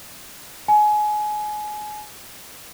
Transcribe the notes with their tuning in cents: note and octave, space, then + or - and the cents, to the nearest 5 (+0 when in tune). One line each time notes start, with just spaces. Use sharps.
G#5 +25